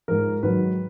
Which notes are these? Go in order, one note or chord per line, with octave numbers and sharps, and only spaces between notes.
G#2 F3 A#4
G#2 D#3 F#3 B4